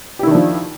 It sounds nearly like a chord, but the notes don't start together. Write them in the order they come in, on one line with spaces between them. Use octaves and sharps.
G4 E4 D#3 D4 F3